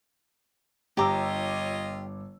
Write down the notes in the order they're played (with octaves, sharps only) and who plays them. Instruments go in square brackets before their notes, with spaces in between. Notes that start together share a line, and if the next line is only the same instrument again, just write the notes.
[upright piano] G1 D6 E6 [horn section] F4 C#5 D#5 [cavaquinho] G4 A#5